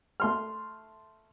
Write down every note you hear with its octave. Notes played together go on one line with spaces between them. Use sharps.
A3 C6 F6